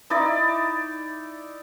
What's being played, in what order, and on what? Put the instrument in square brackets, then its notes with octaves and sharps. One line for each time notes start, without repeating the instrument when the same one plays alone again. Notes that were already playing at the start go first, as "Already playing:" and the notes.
[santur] D#4 E4 D5